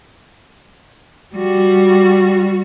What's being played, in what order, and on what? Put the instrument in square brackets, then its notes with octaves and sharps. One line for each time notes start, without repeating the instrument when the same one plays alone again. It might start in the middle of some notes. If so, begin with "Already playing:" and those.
[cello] G3 F#4